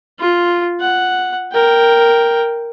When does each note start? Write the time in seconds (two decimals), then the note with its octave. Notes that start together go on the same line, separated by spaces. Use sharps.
0.19 F4
0.80 F#5
1.53 A#4 G5